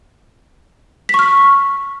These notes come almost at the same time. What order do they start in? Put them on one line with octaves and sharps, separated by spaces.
B6 C#6 F6